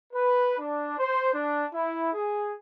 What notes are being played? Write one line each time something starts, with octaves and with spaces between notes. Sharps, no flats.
B4
D4
C5
D4
E4
G#4